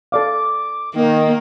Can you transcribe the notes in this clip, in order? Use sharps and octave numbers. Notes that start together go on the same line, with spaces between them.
A4 D5 F5 D6
D#3 A#3